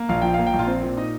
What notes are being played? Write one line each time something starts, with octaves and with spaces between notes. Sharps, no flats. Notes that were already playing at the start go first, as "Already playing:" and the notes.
Already playing: A#3
A#1 F5
F3 G5
A#3 F5
G5
A#1
F4 F5
C4
A#2
D#4 D#5